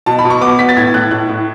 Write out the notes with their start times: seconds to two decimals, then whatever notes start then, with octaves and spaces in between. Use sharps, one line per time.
0.06 B2 A5
0.19 B5
0.25 B2
0.30 C#6
0.41 B3 D6
0.59 B3 B6
0.69 A6
0.77 A2 G#6
0.94 A2 F#6
1.11 A2 F#6
1.29 A2